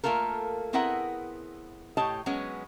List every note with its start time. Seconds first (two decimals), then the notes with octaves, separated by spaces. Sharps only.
0.04 A3 A#3 F4 A4 A#4
0.73 B3 C4 E4 G#4 A#4 F#5
1.97 A2 G4 C#5 D#5 A5
2.26 F#3 G#3 B3 C#4